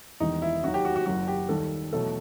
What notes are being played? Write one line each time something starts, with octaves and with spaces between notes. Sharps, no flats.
E1 E2 D#3 G3 D#4
E4
D#2 D#3 F#3 F#4
G4
F#4
F#4
F#1 F#2 F#3 F#4
G4
D#2 D#3 G3 A4
E2 B2 F#3 A3 A4